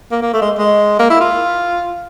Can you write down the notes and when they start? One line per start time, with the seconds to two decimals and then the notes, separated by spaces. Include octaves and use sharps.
0.12 A#3
0.22 A#3
0.33 A3
0.42 G#3
0.58 G#3
0.99 A#3
1.10 E4
1.21 F4